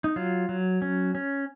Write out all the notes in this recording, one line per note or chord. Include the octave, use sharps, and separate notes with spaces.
D#4
F#3 F4
F#3
C#4
C#4